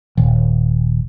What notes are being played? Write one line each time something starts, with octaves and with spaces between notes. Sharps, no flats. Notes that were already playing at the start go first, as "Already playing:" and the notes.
D#1